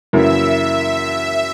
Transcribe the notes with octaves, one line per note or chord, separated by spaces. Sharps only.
F#2 C#3 E3 A#3 E4 E5